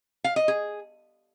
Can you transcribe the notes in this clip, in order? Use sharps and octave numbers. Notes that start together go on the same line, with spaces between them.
F5
D#5
G#4